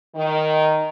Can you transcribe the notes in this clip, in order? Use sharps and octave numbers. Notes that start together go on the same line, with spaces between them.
D#3